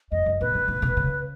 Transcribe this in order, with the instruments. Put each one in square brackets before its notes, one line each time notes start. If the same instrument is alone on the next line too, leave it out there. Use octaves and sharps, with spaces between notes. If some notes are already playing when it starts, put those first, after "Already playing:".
[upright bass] F2 [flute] D#5
[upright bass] F#2
[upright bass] A#2 [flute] B4
[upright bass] A#2
A#2
B2
C#3